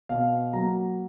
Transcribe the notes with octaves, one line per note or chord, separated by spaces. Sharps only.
B2 F5
F#3 A#3 A#5